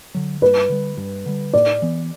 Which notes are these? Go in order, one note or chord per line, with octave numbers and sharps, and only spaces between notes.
D3 F#3
G2 B4
D3 G3
G2
D3 G3
A2 D5
E3 B3